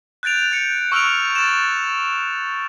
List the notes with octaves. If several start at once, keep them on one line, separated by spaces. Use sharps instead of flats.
F#6 G6 A6 D7 F7
G6 C#7
C#6 E6 F6 D7 F7
A6 E7